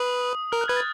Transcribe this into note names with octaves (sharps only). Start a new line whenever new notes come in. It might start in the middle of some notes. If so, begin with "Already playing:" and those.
Already playing: B4 D#6
A#4 F6
F#6
B4 G#6
A6